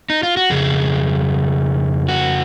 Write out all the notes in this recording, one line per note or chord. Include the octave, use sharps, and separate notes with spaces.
D#4
F4
F#4
F2 C#3 G#4
F#4